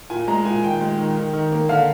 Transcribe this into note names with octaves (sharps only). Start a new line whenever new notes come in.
A#2 G#5
G#3 A#5
A#2 G#5
D#3 G5
G#3
D#3
D#3
D#3
A#3
D3 F5